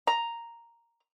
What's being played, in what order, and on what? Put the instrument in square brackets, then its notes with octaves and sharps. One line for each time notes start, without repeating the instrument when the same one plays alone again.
[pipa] A#5